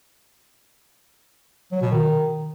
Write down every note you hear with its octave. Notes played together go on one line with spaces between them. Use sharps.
F#3
B2
D#3